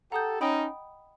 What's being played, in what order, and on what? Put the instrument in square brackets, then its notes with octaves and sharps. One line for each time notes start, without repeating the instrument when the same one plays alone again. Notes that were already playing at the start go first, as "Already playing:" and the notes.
[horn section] G4 A4 [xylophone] F#5 A#5 D#6 G6
[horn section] C#4 D#4 [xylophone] D#5 G5 B5 D#6